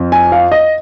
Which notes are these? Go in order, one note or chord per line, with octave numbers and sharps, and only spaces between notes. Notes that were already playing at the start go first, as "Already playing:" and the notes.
Already playing: F2 F3
G#5
F5
D#5